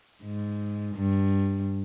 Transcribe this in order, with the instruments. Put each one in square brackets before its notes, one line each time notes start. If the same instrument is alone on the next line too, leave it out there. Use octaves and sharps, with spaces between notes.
[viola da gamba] G#2
G2